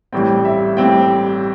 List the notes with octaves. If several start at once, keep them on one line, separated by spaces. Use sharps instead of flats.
A1 A2 G3 C4 G5
E5
A1 A2 G3 C4 G5